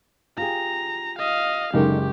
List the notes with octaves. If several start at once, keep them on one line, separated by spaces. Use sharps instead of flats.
F4 G4 G#4 A#5
D#5 F5
F#1 D3 G#3 D#4 G4 A#4